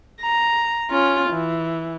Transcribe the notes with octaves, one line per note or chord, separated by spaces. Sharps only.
A#5
C#4 F4
E3